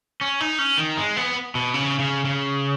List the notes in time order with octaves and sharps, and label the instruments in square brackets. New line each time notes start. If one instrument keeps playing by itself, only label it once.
[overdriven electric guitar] C#4
D#4
C#4
D#3
G#3
B3
B2
C#3
C#3
C#3